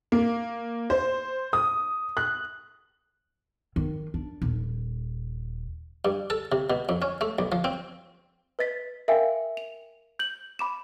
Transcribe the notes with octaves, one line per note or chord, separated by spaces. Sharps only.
A#3
C5
D#6
F#6
D#3
D4
D#1
G2
A4
C3
B2
F2
C#4
A3
B1
F3
C4
B4 D#5 A6 B6
A#4 E5 F5 G5 G#5
F7
G6 F#7
B5 D6 E7